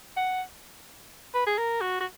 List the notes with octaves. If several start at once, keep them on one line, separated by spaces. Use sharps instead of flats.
F#5
B4
G#4
A#4
F#4
F#4